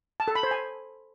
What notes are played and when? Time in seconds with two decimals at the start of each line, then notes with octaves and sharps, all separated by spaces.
0.20 A5
0.28 A4
0.35 B5
0.43 C5
0.51 G#5